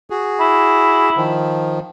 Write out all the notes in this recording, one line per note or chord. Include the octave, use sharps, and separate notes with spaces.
F#4 G#4
E4
D#3 F3